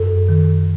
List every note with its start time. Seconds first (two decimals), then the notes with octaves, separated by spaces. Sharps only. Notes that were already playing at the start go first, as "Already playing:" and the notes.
Already playing: F#2 A4
0.29 D#3